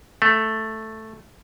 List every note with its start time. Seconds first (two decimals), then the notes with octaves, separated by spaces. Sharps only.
0.22 A3